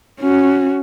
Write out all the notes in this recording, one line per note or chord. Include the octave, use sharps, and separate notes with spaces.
C#4 F#4